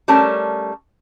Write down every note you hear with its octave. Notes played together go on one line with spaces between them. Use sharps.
G3 A3 C#4 A#4 A5